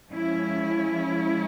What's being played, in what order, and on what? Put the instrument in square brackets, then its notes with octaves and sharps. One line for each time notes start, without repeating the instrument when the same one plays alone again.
[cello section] F3 G#3 C#4 E4